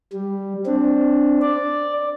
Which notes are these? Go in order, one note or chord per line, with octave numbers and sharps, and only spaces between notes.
G3
C4 D4
D5